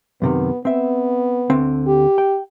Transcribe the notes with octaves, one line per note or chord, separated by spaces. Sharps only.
F#2 C3 D#3 B3
B3 C4 E5
D2 D3 C4
G4
G5